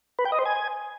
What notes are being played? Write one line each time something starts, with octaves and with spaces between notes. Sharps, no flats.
B4
G5
D#5
C5
G#5